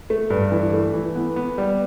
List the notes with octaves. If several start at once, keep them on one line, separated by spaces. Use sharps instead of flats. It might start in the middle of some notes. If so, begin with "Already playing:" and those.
A3
G2
E3
A3
E3
B3
B3
G3